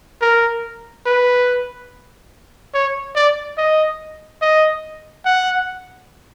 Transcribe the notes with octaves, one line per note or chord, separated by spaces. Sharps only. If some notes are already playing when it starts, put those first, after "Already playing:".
A#4
B4
C#5
D5
D#5
D#5
F#5